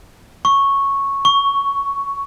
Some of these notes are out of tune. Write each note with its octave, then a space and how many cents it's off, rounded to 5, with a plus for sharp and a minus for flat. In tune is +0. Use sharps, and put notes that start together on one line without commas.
C#6 -5
C#6 +10